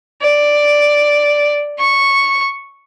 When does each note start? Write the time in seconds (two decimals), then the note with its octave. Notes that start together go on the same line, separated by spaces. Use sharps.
0.21 D5
1.78 C#6